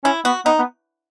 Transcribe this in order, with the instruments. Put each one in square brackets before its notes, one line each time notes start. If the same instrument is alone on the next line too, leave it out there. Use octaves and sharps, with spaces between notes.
[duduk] C#4 [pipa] E4
[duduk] B3 [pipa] F#4
[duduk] B3 [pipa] D#4
[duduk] B3